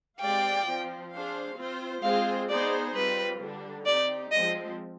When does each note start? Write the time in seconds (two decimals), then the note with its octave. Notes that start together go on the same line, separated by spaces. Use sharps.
0.20 G#3 C4 G4 D5 F5 G5
0.65 F3 C4 F4
1.12 D4 G#4 C5 F5
1.57 C4 F4 C5
2.02 G#3 C4 F4 G#4 C5 F5
2.48 B3 D#4 G#4 C5 D5
2.94 G3 C4 F4 B4
3.40 D3 G3 D4
3.85 C4 D#4 G4 D5
4.31 F3 G#3 C4 D#5